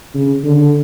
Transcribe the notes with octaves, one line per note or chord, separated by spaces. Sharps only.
C#3
D3